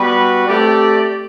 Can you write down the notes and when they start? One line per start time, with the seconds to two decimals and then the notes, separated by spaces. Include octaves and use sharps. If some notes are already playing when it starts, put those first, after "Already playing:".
Already playing: G3 B3 F#4 B4
0.47 A3 C4 G4 D5